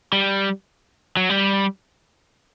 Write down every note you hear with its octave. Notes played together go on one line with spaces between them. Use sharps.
G3
F#3
G3